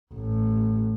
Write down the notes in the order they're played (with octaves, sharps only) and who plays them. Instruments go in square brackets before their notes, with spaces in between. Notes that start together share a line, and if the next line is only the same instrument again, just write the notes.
[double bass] A1